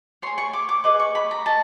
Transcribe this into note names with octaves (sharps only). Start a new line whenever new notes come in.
G#4 C#5 C6
C#6
D6
D6
G#4 B4 D#5 D6
C#6
B5
A#5
D#5 A5